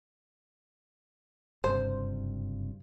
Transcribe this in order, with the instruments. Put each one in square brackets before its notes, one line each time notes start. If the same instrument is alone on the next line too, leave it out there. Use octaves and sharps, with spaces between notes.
[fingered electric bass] F#1 G2 C3 [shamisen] C5